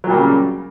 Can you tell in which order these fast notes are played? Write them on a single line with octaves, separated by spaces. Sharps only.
F#3 A#2 G3 A#3 C#3